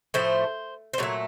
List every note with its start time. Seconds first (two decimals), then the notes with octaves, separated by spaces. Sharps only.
0.14 A2 F3 A3 C5
0.93 C5
0.98 A#2 F#3 A3 C#5